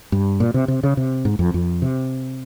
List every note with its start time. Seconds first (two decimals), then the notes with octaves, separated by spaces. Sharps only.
0.12 G2
0.40 A#2
0.54 C3
0.68 C3
0.83 C#3
0.97 C3
1.25 G#2
1.39 F2
1.54 F2
1.82 C3